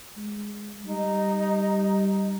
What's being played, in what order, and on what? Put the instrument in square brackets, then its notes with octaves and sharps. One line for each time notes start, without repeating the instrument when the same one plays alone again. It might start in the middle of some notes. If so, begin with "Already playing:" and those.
[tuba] G#3
[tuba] G3 [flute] D#4